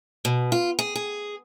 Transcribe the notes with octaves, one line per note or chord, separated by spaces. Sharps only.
B2
F4
G#4
G#4